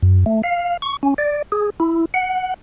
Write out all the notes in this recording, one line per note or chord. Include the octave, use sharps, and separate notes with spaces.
F#2
A3
F5
C#6
C#4
D5
G#4
E4
F#5